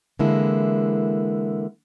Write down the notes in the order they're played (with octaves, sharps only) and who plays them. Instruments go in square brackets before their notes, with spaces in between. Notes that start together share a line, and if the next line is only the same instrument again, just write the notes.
[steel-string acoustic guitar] D3 E3 G#3 A#3 E4 A#4